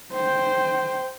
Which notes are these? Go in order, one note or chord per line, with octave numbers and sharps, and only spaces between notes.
C5 G5